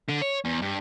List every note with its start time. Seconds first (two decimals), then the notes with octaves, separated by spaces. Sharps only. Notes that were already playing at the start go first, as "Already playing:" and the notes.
0.09 D3
0.21 C#5
0.45 E2
0.62 G2